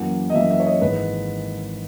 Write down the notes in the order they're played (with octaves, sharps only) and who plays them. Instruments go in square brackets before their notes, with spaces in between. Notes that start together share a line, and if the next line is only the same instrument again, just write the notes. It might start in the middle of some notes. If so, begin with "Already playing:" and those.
Already playing: [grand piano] F#2 E3 A#3 F#5
D#5
F#2 E3 A#3 E5
E5
C#5
D#5
G#1 G#2 E3 B4